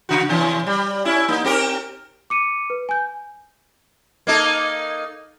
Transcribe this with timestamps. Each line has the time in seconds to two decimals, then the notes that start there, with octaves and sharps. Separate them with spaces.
0.09 C#3 F#4
0.29 B2 E3 C#4
0.66 G3
1.05 C#4 E4
1.28 A#3 D#4
1.44 C4 G4 A#4
2.30 D6 C#7 D#7
2.70 B4
2.89 G#5 G6
4.27 A#3 D#4 A4